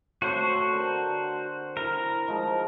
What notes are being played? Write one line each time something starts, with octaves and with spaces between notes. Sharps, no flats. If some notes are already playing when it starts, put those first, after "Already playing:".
A3 C4 F#4 C5 C#5
D3 A#4 C6
E4 A#4
F3 G#3 D#4